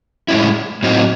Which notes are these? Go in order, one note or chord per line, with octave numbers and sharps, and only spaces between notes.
A2 G#3 C#4 E4
A2 F#3 C4 D#4